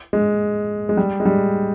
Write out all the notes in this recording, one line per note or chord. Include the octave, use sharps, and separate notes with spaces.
G#3
G#3
G3
G#3
G3